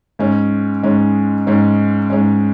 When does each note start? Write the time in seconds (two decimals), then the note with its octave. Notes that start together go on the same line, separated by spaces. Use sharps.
0.19 G#2 G#3 C#4
0.83 G#2 G#3 C#4
1.47 G#2 G#3 C#4
2.10 G#2 G#3 C#4